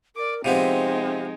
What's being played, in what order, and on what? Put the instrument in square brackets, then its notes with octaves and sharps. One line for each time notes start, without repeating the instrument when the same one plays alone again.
[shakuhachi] A#4 [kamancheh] D5 D6
[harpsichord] C3 F3 B3 [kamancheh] G#3 D#4 [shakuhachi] C4